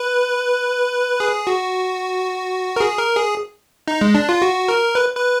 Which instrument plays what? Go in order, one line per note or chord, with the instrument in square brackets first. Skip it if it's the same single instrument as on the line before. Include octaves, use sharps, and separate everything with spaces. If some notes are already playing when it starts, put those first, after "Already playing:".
Already playing: [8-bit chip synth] B4
G#4
F#4
A#4
G#4
A#4
G#4
D#4
G#3
D4
F4
F#4
A#4
B4
B4